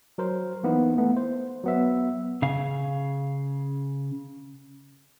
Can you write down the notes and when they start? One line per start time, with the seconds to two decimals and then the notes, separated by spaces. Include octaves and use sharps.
0.18 F#3 A#4 C5
0.63 E3 A#3 B3 D#4 E4
0.98 A3 B3
1.17 C5
1.64 F#3 B3 E5
2.42 C#3 F5 G#5